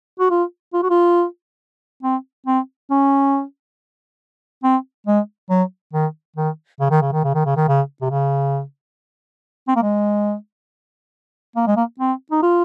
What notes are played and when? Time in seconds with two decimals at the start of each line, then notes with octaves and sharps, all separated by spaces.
0.20 F#4
0.30 F4
0.74 F4
0.83 F#4
0.90 F4
2.03 C4
2.46 C4
2.91 C#4
4.64 C4
5.07 G#3
5.50 F#3
5.93 D#3
6.36 D#3
6.80 C#3
6.91 D#3
7.02 C#3
7.12 D#3
7.24 C#3
7.35 D#3
7.46 C#3
7.57 D#3
7.68 C#3
8.02 C3
8.10 C#3
9.68 C4
9.76 A#3
9.82 G#3
11.56 A#3
11.67 G#3
11.77 A#3
12.00 C4
12.31 D#4
12.43 F4